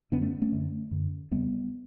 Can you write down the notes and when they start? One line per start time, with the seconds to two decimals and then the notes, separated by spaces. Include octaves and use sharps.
0.12 F#2 D3 B3 D4
0.21 A3 C#4
0.42 A3 C#4
0.52 F#2 D3
0.91 F#2 D3
1.31 E2 C#3 G3 B3